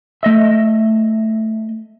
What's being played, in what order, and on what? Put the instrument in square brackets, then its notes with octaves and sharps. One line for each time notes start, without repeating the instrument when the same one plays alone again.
[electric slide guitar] A3 D#5 E5